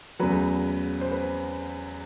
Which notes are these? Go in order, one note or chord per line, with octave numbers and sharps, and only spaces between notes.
E2 C#3 F#3 A3 B4
C5
B4